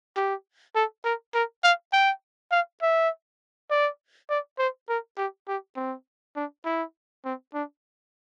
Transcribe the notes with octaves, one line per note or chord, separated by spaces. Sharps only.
G4
A4
A#4
A#4
F5
G5
F5
E5
D5
D5
C5
A#4
G4
G4
C4
D4
E4
C4
D4